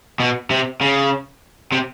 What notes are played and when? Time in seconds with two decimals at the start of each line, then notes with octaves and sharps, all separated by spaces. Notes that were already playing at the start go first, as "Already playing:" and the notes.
0.20 B2
0.50 C3
0.81 C#3
1.72 C3